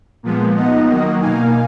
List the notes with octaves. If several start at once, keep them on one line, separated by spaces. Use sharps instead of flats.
A#2 F3 G#3 B3
F3 B3 D#4 D#5 F#5
D#3 F#3 A#3
B2 A#3 D#4 F5 G#5